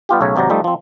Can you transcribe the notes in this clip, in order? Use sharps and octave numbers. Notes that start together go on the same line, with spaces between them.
G3 B3 F4 G4
B1 C#3 A3 C#5
G#1 C3 F#3 D5 A#5
F3 G3 A3 D#4
F3 C4